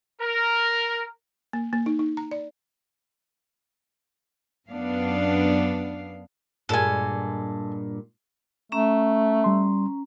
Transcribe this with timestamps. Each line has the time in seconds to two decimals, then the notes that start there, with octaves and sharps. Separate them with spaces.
0.20 A#4
1.53 A#3
1.73 A#3
1.86 D#4
1.99 D#4
2.17 A#5
2.31 D5
4.70 F#2 B3 D4 F5
6.69 G2 A#2 G#3 A4 G#5
8.72 A3 C#4 A#5
9.44 G3 C6